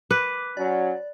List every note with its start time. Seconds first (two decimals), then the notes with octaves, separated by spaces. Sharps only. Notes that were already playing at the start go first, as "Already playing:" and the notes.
0.11 B4 D6
0.57 F#3 C#4 D5